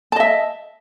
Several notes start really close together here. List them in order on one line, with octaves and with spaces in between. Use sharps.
A5 D#5 E5